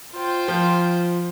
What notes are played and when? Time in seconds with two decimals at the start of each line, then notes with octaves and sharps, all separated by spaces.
0.14 F4 C5 G5
0.48 F3